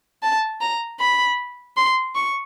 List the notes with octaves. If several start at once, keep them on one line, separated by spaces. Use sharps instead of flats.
A5
A#5
B5
C6
C#6